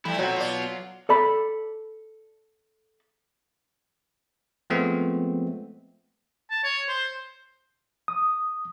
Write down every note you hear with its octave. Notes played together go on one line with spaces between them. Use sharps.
F3 G3 A3 E4
F#3 B3 C4 F#4 F#5
F4 D5
A4 D5 A5 B5
F3 G#3 A3 B3 C4
A5
C#5
C5
D#6